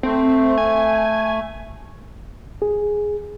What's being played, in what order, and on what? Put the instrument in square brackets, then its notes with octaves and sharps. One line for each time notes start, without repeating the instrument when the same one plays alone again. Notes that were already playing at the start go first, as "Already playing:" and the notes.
[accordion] A3 [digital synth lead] C4
[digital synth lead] G#5
[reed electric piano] G#4